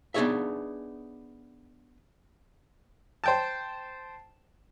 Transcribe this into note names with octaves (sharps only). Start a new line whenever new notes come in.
B3 D4 D#4 G#4 C#5 E5
C5 G5 A5